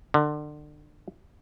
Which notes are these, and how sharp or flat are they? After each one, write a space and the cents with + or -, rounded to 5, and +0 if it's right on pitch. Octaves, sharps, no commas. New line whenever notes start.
D3 +30